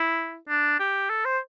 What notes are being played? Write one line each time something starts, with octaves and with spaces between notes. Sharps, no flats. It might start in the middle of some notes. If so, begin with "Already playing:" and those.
Already playing: E4
D4
G4
A4
C5